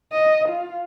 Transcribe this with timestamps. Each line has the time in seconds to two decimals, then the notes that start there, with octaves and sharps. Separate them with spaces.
0.12 D#5
0.49 F4